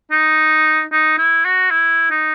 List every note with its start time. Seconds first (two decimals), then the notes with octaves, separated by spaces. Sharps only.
0.12 D#4
0.92 D#4
1.18 E4
1.45 F#4
1.71 E4
2.11 D#4